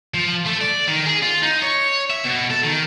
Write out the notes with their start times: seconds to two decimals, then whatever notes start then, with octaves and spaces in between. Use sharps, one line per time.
0.14 F3
0.46 A3
0.61 D5
0.88 D#3
1.06 G#4
1.23 F4
1.43 D#4
1.63 C#5
2.11 E5
2.25 B2
2.51 A4
2.64 D#3